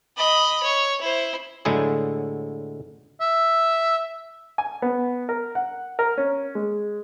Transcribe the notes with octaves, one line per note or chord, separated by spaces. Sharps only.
D#5 B5
C#5
E4 C5
A2 D3 F#3 G#3 E4 G#4
E5
G#5
B3
A#4
F#5
A#4
C#4
G#3